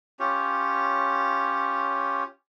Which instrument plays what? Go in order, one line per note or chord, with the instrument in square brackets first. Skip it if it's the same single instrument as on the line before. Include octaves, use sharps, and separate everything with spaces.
[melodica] C#4 F4 G4 C#5